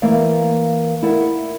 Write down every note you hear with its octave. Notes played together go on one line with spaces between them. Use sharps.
E3 A#3 A#4 D5 F5
E4 A#4 D5 F#5